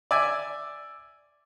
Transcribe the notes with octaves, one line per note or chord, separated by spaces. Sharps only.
D5 E5 G#5